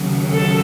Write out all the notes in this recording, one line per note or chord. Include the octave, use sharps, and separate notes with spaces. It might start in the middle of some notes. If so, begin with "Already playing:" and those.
Already playing: D#2 C#3 F#3
A4